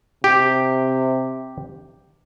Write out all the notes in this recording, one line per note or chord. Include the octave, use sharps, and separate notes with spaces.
C3 G4